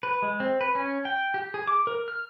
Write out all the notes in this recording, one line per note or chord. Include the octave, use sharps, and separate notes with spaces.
B4
G#3
C4
B4
C#4
G5
G4
G#4
D6
A#4
F6